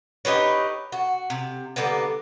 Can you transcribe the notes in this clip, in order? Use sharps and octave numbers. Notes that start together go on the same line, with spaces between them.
D#4 G4 B4 C#5
F#4
C3
D3 G3 A#3 B3